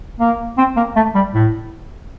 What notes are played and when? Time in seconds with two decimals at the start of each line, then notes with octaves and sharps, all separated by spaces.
0.20 A#3
0.58 C4
0.76 A#3
0.96 A3
1.15 G3
1.34 A2